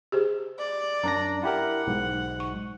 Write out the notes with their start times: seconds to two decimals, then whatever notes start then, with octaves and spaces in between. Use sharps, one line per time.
0.12 G4 G#4 C5
0.58 D5
1.03 F#2 C#4 D4 A#5 A#6
1.43 E4 G4 A#4 F#5
1.87 B1 G#2
2.40 C#6